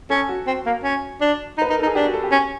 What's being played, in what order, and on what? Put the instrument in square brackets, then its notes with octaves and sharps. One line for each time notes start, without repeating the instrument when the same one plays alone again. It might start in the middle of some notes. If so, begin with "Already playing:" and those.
[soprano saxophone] C#4 [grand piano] A4
[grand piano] F#4
[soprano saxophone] C4
A#3
C#4
D4
D#4
[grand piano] B4
[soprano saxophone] D#4 [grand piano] A#4
[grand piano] A4
[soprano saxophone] D#4
[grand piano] G#4
[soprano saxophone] D4 [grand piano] G4
[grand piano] F#4
A4
G4
[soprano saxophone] C#4